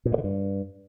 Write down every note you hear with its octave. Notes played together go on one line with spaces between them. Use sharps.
A#2
G2
D3
G2